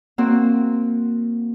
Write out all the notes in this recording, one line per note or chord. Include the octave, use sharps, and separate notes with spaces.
A#3 C4 F#4